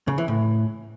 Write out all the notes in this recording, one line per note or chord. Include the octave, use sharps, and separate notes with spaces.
C#3
E3
A2